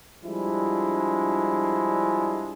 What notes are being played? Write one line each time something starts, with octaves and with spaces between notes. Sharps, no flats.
F3 G3 G#3 D4 E4